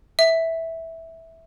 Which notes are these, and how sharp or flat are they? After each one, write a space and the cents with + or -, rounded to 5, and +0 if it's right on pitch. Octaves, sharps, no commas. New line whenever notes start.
E5 -10